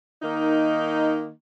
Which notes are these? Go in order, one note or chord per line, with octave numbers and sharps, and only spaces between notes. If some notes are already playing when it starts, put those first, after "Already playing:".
D#3 A#3 D#4